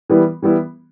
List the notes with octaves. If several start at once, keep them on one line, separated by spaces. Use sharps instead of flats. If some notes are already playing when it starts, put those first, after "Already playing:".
E3 G3 B3 E4
E3 G3 B3 E4